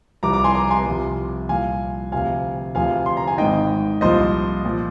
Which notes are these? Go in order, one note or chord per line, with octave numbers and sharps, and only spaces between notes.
C2 C3 F3 A#5 D6
A#5 D6
G#5 C6
A#5 D6
G#5 C6
C2 C3 F3
C2 A#2 F3 F5 G#5
D2 C3 F3 F5 G#5
D2 C3 F3 F5 G#5
C6
A#5
G#5
G#1 G#2 D#3 D#5 G5
C2 A#2 F3 C5 D#5
A#2 F3